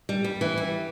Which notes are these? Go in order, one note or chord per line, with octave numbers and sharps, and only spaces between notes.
G3
G3
E3
G3